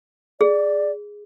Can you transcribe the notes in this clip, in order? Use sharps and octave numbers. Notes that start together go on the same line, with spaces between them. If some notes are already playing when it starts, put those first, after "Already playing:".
G#4 D5